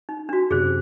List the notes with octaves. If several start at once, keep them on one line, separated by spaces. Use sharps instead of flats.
D#4
D4 F#4
F#2 C3 G#4 C5